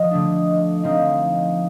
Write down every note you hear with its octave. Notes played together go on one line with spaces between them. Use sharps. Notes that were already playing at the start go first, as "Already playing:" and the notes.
Already playing: F3 D#5
D3 A3 D4
F3 C4 D#4